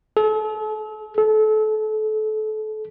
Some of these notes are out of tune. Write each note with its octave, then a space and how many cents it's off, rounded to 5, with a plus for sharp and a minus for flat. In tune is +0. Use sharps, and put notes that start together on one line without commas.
A4 -40
A4 -30